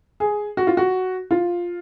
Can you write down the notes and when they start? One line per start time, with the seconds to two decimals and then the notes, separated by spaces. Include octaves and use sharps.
0.20 G#4
0.57 F#4
0.67 F4
0.77 F#4
1.31 F4